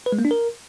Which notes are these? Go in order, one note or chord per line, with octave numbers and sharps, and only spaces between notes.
B4
G#3
A#3
D4
A#4